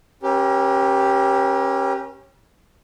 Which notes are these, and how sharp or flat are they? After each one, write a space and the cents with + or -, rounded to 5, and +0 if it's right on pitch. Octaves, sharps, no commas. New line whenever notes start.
C#4 -25 G4 +0 A#4 +40